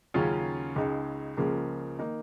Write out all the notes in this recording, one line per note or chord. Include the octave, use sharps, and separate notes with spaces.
D#2 C#3 F#3 C#4 F4
C#2 C#3 G#3 D#4
C#2 C#3 F3 A#3
D#3 A#3 D#4